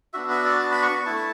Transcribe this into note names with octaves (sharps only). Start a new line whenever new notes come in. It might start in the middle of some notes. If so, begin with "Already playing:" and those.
B3 D4 F#4 E5
E5
D5
A5
B5
C#6
A3 E4 A5